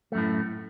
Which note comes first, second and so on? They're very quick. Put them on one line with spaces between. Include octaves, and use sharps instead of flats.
A3 F#2 A2